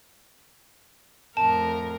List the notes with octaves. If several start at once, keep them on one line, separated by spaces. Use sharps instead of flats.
F2 A2 A#4 A5